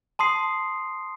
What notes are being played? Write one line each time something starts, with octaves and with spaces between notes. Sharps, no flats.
A5 C6 D#6 C7